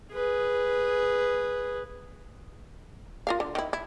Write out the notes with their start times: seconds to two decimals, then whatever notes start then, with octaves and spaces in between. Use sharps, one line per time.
0.12 G#4 B4
3.27 F4 A#4 F5
3.40 D3
3.55 D#3 E4
3.73 E4